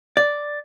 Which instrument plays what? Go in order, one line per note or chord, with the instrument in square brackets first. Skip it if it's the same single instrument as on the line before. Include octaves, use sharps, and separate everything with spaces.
[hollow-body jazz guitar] D5